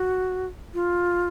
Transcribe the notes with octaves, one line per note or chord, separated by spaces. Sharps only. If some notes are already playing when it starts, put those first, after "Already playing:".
Already playing: F#4
F4